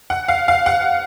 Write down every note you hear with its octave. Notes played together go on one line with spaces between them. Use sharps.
F#5
F5
F5
F#5